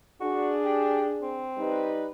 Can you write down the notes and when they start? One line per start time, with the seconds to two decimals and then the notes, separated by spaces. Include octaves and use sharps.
0.21 D4 F#4 G#4
0.65 G4
1.22 C4
1.57 G3 D#4 B4